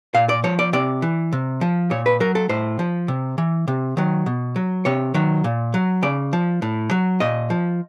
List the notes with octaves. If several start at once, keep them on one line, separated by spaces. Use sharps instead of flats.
A#2 F5
D5
F3 C#5
D5
C3 D5
E3
C3
F3
A#2 C#5
B4
F#3 A#4
A4
A2 C5
F3
C3
E3
C3
D#3 F#3
B2
F#3
C3 C#5
D#3 F#3
A#2
F#3
C#3 D5
F3
A2
F#3
A#2 D#5
F3